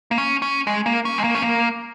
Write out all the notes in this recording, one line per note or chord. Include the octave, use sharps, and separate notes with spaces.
A#3
C#4
C#4
G#3
A#3
C#4
G#3
A#3
C#4
A#3